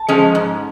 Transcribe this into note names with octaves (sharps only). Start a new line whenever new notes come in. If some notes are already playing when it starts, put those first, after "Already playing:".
Already playing: A5
F3 G#3 C#4
G#2